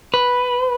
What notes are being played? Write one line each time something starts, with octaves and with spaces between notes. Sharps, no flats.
B4